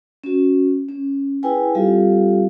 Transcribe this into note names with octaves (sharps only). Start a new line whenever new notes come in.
C#4 F#4
C#4
E4 G#4 B4 G5 G#5
G3 C4 F4 G4 A4 F5